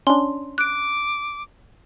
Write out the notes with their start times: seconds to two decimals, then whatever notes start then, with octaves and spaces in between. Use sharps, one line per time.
0.07 C#4 D4 C6
0.58 D6 F#6 D7